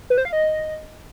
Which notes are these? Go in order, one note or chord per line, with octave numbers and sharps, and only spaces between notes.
B4
C5
F5
D#5